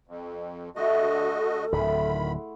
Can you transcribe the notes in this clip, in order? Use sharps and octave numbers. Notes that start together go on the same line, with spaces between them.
F2
D3 A3 F#4 G#4 A4 D#5 E5
D1 D2 D3 D#3 E4 F#5 B5 C6